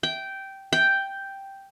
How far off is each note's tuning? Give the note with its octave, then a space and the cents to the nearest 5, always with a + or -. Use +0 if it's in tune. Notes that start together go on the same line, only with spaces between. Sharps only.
G5 -10
G5 +0